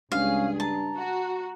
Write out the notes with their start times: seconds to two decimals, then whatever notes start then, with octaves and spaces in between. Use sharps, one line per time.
0.12 C#2 G2 C#4 G#4 F5
0.60 A5 A#5
0.97 F#4